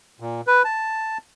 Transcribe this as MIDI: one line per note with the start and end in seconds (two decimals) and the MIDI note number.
0.20 0.41 46
0.47 0.62 71
0.65 1.18 81